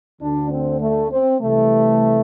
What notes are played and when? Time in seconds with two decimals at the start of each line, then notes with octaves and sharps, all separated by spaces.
0.20 D2 D3 D4
0.51 C4
0.81 A3
1.10 C4
1.41 C2 C3 E3 A3